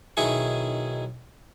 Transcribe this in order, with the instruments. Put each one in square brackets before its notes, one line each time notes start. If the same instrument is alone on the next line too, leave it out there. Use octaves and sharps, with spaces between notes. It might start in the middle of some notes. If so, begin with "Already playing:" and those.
[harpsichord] B1 D#3 E4 G#4 G#5 C#6